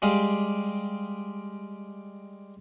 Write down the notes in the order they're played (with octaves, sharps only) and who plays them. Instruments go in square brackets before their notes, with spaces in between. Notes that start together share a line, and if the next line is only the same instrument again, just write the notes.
[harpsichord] G3 G#3 G4 F5